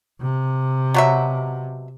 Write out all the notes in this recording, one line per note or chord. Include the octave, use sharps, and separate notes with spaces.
C3
B2 F#3 E5